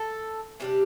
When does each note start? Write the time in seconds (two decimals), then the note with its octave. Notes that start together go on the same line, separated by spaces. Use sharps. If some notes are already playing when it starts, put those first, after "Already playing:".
Already playing: A4
0.60 C3 G3 D4 G4